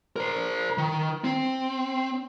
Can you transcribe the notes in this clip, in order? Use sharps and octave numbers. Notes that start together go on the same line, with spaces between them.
A#4 C5
D#3
C4